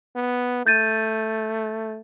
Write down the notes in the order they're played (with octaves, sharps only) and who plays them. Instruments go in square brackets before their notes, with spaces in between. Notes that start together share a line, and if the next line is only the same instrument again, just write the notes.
[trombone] B3
[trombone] A3 [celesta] G6 A6 D#7